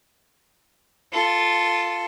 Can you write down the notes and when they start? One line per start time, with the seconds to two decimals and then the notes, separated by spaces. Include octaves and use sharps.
1.13 F4 A4